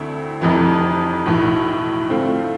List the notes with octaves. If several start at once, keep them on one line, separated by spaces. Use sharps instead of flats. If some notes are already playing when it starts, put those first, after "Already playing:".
Already playing: D2 D3 A3 C4 E4
F1 F2 E3
B1 A2 E3
D3 A3 C4 F4